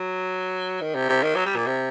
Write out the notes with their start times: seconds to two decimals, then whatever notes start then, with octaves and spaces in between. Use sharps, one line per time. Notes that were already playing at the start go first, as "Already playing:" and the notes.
Already playing: F#3
0.81 D#3
0.95 C3
1.09 C3
1.23 D#3
1.35 F#3
1.45 G3
1.56 A#2
1.66 C3